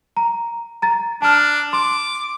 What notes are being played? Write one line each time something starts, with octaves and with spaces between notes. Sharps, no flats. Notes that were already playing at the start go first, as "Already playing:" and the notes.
A#5
A#5 A6
D4 A5 F6
C6 D6